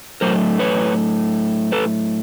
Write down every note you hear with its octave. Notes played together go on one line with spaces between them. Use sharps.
A2 F#3 A3 A#4 C5
B4 C#5
A4 B4